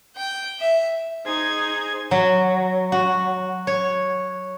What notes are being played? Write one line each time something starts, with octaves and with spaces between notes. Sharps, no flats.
G5
E5
D#4 G#4 C5 G#6
F#3
F#4
C#5